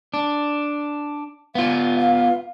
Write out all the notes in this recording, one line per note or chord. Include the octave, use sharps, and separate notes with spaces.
D4
B3 F4 F5
F5